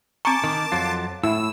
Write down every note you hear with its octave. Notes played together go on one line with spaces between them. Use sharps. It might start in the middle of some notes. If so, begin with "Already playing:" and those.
C4 A5 A#5 C#6 D6
D#3
F2 F#3 F4
A2 E4 E6